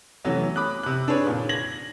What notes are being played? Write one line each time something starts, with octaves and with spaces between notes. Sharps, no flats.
C3 E3 F#3 A3 B3 C#4
B5 D6 D#6 F#6
C3 F#6
D4 G#4 B4 C#5
A#2 D#3
G#6 A#6 F#7